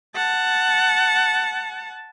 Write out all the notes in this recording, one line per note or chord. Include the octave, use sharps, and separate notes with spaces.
F#5 A5